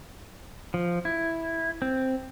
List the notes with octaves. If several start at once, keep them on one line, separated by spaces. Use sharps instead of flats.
F3
E4
C4